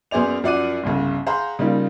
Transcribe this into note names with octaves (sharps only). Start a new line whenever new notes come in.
F#2 B3 G#4 C5 D5 F7
F#2 F3 D5 F#5 D6 D#7
G1 C2 C#3
G#4 C5 F5 F#5 A#5 B5
C#3 G3 A#3 D#4 F4